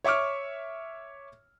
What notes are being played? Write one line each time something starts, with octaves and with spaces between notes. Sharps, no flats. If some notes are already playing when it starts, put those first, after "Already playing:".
C#5 E5 C#6 D6 F6